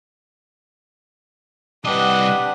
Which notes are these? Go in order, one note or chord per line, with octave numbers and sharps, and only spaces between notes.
C2 D4 G4 B4 D#5 F#5